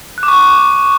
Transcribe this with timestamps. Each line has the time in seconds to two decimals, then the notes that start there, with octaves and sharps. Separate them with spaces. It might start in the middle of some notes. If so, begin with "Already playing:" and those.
0.18 F#6
0.23 D6
0.28 C#6